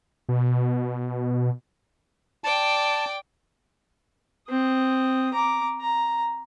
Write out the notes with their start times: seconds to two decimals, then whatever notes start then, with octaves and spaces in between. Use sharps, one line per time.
0.29 B2
2.44 D5 G5 A5
4.50 C4 D#6
5.34 A#5 D6
5.81 A#5